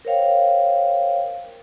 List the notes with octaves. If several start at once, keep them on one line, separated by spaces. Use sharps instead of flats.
A#4 C5 C#5 F5 G5